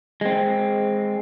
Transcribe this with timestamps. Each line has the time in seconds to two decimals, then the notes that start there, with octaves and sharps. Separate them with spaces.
0.21 G#3 C4